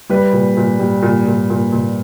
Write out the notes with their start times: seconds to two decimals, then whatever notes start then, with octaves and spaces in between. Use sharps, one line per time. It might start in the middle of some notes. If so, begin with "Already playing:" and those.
0.09 G3 B4
0.33 A#2
0.57 A#2
0.79 G3
1.02 A#2
1.27 A#2
1.50 A#2
1.72 A#2